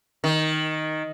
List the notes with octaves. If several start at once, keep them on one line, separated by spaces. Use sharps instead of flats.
D#3